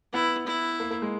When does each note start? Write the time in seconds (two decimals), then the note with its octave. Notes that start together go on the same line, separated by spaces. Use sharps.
0.13 B3 E4
0.47 E4
0.80 A#3
0.91 A#3
1.02 G#3